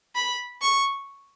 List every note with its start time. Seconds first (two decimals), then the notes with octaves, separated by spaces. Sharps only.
0.15 B5
0.62 C#6